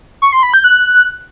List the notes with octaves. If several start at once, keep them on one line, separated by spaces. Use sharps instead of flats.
C#6
C6
B5
G6
F#6